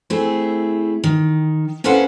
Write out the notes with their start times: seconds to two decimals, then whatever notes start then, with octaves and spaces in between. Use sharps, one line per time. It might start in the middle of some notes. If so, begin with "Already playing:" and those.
0.10 A3 C4 E4 G#4
1.04 D#3
1.84 A#3 C#4 A4 B4 C5 F#5